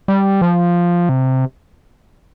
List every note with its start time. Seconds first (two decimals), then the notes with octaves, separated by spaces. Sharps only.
0.08 G3
0.41 F3
1.09 C3